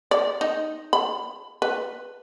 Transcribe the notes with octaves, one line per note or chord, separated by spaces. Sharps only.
D5
D#4
B5
B4